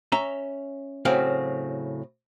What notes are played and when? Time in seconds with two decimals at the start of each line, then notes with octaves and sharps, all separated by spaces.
0.12 C#4 E5 A#5
1.05 A2 C#3 F#3 C4 F5